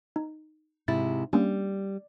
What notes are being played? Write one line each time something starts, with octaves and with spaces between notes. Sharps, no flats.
D#4
G#2 C3 E4 A6
G3 A#3 C#4 D4